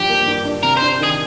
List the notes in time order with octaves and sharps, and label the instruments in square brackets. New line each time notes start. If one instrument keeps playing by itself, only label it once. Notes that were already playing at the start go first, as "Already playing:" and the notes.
Already playing: [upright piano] G2 F3 D4 [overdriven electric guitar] G4
[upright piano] A#3
G2
D4
[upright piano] C3 [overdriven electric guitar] A#4
[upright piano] D4 [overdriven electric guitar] C5
[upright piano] D#3 [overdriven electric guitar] G#4